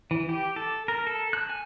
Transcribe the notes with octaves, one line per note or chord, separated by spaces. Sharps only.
E3
G4
A4
A#4
A4
F#6
G#5